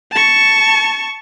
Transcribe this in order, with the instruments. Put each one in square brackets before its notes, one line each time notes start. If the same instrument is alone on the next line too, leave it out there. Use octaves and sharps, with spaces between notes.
[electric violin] A5 C#6